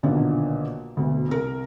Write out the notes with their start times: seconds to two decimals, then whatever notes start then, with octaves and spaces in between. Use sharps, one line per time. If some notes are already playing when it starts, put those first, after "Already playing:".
0.03 B1 A#2 D3 D#3 A#3
0.97 D2 B2
1.28 C2 A#4